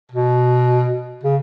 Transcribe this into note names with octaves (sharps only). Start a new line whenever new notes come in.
B2
C#3